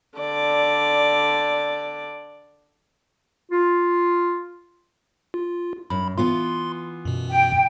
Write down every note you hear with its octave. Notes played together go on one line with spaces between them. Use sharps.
D3 D5
F4
F4
F#2 B5
E3 B3 F4 C6
F#2 B2
G5